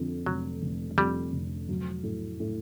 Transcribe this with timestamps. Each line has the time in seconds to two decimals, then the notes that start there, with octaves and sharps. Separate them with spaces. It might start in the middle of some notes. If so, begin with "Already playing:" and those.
Already playing: F2 D3
0.26 F1 F#3
0.62 F1
0.97 F2 G3
1.33 F1
1.69 F#3
2.03 A2
2.40 A2